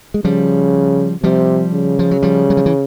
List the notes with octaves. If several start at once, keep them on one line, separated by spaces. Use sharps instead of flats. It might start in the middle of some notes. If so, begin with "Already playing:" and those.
G#3
C#3 F3 G3
C3 F3 G3
C#3
F3
F#3
F3 G3
F#3
F3
E3